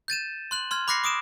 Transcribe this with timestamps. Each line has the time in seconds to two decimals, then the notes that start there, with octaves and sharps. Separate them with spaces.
0.08 G6 A6 D#7 E7
0.51 C6 F#6 F#7
0.71 C6 F6 G#6
0.88 B5 D6 F#6 A#6 C7 C#7
1.04 D6 D#6 D7 E7